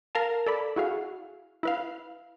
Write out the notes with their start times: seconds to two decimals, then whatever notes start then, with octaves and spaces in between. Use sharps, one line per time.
0.15 A#4 F5 A5
0.46 A4 D5 B5
0.76 E4 F#4 G#4 F5
1.63 E4 B4 F5